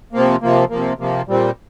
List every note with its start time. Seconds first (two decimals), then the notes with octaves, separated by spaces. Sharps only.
0.13 C3 F3 A#3
0.42 C3 F3 A#3
0.70 C3 F3 A#3
0.99 C3 F3 A#3
1.28 A#2 G3 C4